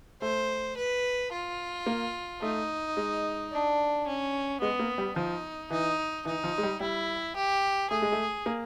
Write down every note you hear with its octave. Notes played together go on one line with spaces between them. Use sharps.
A3 C5
B4
F4
A#3
A3 D#4
G#3
D4
C#4
G#3 B3
A#3
G3
F3 D#4
E3 D#4
E3 D#4
F3
G#3
G3
G3 E4
G4
A3 G#4
G#3
A3
A#3